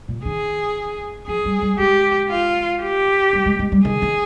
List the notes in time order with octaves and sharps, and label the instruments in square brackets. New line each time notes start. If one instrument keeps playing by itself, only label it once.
[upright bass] A#2
[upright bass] D#3 [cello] G#4
[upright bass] F3 [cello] G#4
[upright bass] G3
G3
[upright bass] G#3 [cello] G4
[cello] F4
G4
[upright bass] G3
G#3
G#3
G3
[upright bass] D#3 [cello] G#4
[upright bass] D#3